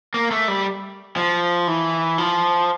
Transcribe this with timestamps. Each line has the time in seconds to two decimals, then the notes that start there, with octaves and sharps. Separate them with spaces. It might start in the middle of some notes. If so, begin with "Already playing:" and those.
0.14 A#3
0.31 A3
0.48 G3
1.17 F3
1.68 E3
2.18 F3